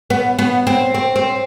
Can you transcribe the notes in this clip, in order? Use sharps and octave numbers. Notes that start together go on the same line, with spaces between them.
B3
B3
C4
C4
C4